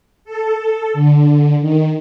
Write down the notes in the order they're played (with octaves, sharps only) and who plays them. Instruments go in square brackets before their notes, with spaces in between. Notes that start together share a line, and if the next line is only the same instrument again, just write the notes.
[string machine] A4
D3
D#3